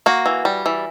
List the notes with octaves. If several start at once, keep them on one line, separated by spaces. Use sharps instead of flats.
A#3 F#4
E3
G3
E3